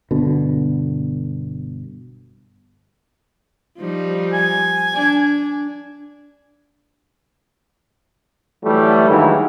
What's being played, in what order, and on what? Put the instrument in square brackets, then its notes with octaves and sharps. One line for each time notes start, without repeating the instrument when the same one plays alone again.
[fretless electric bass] G1 B2 D3
[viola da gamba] F3 G3 D#4
[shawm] G#5
[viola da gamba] D4
[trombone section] A2 E3 F#3 G3 A3
G2 D#3 E3 F#3 G#3